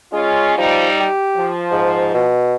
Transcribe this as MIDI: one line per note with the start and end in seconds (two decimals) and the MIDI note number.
0.13 0.53 56
0.13 0.55 61
0.13 0.55 65
0.58 0.88 53
0.58 1.05 55
0.58 1.05 63
1.01 1.50 67
1.37 2.31 53
1.72 2.13 44
2.14 2.56 47